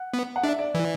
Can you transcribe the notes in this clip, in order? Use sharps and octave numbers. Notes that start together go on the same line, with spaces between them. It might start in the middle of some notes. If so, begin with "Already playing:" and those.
Already playing: F#5
B3
F#5
D4 E5
D5
E3 D5